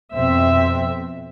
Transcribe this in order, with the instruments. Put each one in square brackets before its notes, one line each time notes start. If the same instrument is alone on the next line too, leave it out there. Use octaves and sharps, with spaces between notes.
[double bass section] F2 B2 C4 [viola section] E5